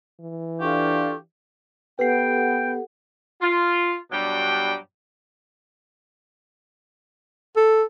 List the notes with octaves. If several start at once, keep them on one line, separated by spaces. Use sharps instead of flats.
E3
D4 F4 G4 A4 F5 C#6
B3 G4 A4 B4 F#5 G5 C7
F4
G2 B2 F#3 G3 D4 G5
A4